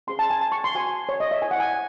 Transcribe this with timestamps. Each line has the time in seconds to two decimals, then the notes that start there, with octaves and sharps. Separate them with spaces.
0.07 C#4 G#4 C5 C6
0.19 A5
0.30 G#5
0.41 A5
0.52 C#6
0.64 C6
0.75 F#4 C5 G#5
1.09 C#5
1.20 D#5
1.31 E5
1.42 E4 C5 G#5
1.51 F#5
1.60 G#5